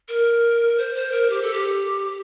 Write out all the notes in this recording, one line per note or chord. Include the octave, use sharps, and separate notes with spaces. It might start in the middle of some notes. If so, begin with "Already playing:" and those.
A#4
C5
C5
A#4
G4
A4
G4